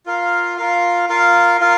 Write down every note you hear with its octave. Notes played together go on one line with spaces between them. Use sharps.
F4 A#4 F5
F4 A#4 F5
F4 A#4 F5
F4 A#4 F5